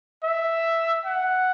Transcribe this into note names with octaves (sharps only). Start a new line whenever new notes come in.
E5
F#5